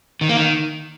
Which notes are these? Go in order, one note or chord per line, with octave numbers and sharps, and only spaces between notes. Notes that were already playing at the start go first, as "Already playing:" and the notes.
D#3
A#3
D#3